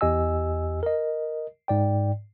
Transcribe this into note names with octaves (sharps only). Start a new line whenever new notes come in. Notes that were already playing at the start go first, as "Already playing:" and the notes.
E2 G4 D#5 G#5 E6
A#4 D#5
G#2 D5 G5